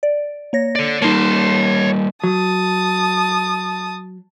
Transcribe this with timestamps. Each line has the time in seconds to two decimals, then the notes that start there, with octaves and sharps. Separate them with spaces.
0.03 D5
0.53 A#3 C#5 A#6
0.75 A4 D5
1.02 G3 A#3 D#4 C#5 A5 C6
2.24 F#3 A5 D#6